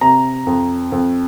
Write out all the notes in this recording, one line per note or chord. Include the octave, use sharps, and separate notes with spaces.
C3 A#5
F2
F2